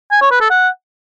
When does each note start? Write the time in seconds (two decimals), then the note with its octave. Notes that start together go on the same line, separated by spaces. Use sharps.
0.11 G#5
0.21 C#5
0.31 B4
0.40 A4
0.50 F#5